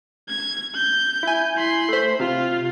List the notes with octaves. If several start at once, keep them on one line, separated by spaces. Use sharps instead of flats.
G#6
G6
E4 G#5
B5 C6
A3 C5
C3 F4